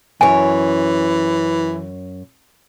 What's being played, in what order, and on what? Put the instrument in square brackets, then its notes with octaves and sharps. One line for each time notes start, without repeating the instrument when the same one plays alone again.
[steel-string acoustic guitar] F#2 C#5 [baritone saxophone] E3 [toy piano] G#5